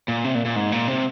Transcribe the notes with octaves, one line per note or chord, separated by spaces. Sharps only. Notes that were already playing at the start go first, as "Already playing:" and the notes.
A#2
C3
A#2
A#2
G#2
A#2
C3